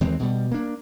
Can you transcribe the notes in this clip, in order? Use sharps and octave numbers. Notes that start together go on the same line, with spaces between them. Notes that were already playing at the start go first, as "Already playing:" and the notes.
D#2 E3 G#3 C4
B2 G3
A#3 D4